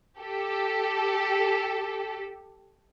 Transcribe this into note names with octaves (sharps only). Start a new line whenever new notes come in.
G4 A4